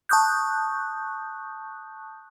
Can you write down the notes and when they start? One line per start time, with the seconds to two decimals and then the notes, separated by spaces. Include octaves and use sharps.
0.09 A5 C#6 D#6 F#6 G6